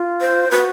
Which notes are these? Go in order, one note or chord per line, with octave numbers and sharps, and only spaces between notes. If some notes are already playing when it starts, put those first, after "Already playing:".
Already playing: F4
C5
F#4 B4